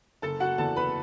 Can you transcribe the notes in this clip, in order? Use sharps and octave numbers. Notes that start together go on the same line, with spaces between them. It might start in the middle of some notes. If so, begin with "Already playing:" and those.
F#1 A4 A5
F#4 F#5
E2 E3 A4 A5
B4 B5